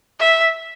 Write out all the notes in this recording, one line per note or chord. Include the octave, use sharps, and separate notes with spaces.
E5